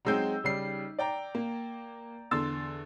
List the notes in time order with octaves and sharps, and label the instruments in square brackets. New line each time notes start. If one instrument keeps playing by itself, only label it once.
[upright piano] F#3 G#3 C4 [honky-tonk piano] D#4 E6 G6
[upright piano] C#3 G3 C7
D5 G5 A#5
[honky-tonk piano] A#3
[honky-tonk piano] E2 D3 [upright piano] C6 E6 A6